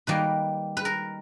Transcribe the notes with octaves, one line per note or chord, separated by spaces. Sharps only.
D#3 G3 A#3 B4
B4
A#4